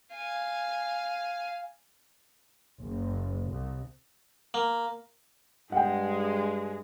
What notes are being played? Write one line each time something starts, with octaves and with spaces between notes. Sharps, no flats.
F5 G#5
F#1
C2
A#3
G2 G#3 G#4 F#5 G5